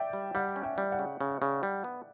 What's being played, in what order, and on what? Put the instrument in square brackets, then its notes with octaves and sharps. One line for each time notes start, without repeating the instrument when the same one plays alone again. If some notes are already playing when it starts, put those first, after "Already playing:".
Already playing: [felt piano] D5 E5 G5
[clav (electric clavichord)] G3
[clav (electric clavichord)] G3 [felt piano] D5 F#5
[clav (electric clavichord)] C#4
[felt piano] E5 G5
[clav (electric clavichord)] G3
[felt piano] D5 F#5
[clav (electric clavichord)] C#3
C#3
C#3
G3
B3